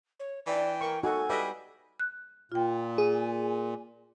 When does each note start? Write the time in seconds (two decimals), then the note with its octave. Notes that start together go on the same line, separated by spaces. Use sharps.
0.20 C#5
0.47 E3 D5 G5
0.81 A#4 C#6
1.03 D#4 F#4 A4 G#5
1.29 G3 B4 D#5 E5
2.00 F#6
2.52 A#2 F4 G5
2.98 G#4